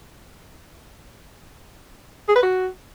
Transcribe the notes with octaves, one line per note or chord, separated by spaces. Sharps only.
G#4
B4
F#4